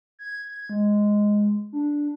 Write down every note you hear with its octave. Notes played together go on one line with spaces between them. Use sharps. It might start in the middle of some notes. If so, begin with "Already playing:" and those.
G#6
G#3
D4